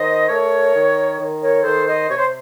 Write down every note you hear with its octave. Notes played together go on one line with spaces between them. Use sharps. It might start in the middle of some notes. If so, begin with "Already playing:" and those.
Already playing: D#3 C5 D#5
A3 A#4 C#5
D#3
D#3
A#4 C#5
D#3 A4 C5
C5 D#5
C3 C#5
C5